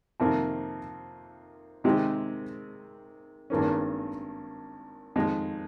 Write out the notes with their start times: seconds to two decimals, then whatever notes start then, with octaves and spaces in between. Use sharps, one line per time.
0.20 F2 C3 D#3 A#3
1.84 C3 D#3 G#3 C4 G4
3.50 G#1 G2 D#3 A#3 C#4
5.16 F2 D#3 G#3